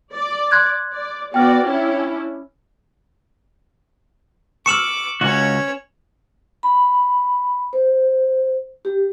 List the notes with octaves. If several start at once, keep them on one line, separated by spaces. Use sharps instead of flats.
D5
C6 F#6 G#6
D5
B3 F#4 D5 G5 F6
C#4 D4 E4
C#6 D6 E6 F6 C#7 E7 F#7
C#2 C#4 F#4 C#5
B5
C5
G4